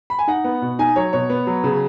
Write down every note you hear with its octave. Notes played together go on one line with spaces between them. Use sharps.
B5
G#5
D#4 F#5
B3
B2
D#4 G#5
F#3 C#5
B2 C#5
B3
F#3
C#3